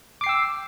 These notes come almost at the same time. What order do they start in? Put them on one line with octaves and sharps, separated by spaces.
D6 C7 G5 E6